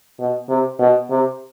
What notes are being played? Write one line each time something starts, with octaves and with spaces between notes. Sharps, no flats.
B2
C3
B2
C3